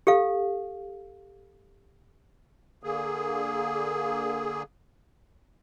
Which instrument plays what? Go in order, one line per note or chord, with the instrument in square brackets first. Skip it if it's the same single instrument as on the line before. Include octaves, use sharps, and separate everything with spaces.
[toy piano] G4 A4 F5
[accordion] D3 A#3 G#4